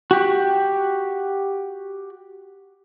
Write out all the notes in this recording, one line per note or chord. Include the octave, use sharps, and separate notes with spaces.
F#4 G4